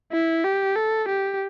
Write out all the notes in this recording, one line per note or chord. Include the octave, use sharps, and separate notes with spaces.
E4
G4
A4
G4